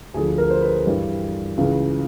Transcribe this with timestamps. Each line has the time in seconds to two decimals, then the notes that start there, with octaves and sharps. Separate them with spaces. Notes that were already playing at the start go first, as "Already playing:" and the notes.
0.14 D2 D3 F3 G#4
0.38 A#4
0.50 C5
0.62 B4
0.86 G2 E3 G3
1.57 C#2 C#3 E3